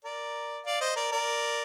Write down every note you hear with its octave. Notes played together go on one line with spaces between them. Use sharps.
A#4 D5
D5 F5
C5 D#5
A#4 D5
A#4 D5